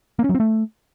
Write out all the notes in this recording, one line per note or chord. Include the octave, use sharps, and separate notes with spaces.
A#3
C#4
F#3
C4
A3